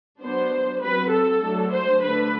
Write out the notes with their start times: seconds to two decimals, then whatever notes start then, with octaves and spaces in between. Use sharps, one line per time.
0.21 F#3 B3 D4 C5
0.81 F#3 C4 B4
1.12 A4
1.42 F#3 A3 D4
1.72 C5
2.03 D3 A3 D4 B4